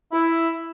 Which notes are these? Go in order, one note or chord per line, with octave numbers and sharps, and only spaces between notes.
E4